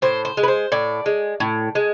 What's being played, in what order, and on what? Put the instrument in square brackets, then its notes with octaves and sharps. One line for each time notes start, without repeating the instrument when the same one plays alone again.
[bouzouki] A2 C5
C5
G#3
B4
C5
A2 D5
G#3
A2
G#3